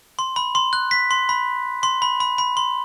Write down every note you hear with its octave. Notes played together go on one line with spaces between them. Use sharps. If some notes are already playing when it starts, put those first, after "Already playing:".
C6
B5
C6
F#6
B6
C6
B5
C6
B5
B5
B5
C6